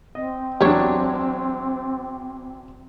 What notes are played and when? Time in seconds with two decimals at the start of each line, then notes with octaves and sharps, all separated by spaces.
0.15 C4 D#5
0.61 E2 F#3 D4 G4 C#5